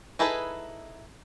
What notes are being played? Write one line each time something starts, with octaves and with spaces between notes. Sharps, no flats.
D#4 E4 G#4 A4 B4